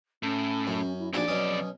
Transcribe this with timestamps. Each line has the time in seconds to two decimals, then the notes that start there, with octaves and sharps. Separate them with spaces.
0.23 A2 C#4
0.67 F#2
0.99 E4
1.13 A#1 F2 D#4 F#4 G#4 D5
1.28 B2 F#3 C#4 D#6